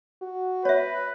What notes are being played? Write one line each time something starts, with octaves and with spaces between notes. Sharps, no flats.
F#4
B4 C#5 E5